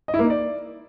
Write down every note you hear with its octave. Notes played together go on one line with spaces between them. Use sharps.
D#5
E4
A#3
D#4
D5